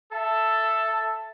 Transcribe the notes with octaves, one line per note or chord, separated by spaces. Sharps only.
A4 E5 A5